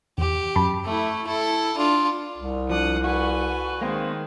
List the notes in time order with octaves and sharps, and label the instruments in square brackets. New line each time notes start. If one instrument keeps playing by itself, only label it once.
[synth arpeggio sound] E2 [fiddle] G4
[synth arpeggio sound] F#2 A5 B5
[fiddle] A3 E4
E4 A4
D4 F4
[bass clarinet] C2
[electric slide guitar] F3 D4 [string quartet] F#5 D#6
[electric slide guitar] F#4 [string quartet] A4 B4 G#5
[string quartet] D#3 G#3 [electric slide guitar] A#3 C4